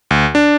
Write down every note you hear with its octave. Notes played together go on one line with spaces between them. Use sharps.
D2
D4